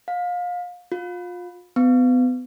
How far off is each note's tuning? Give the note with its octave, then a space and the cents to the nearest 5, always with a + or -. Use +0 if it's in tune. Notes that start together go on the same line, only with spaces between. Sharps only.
F5 +30
F4 +25
B3 +30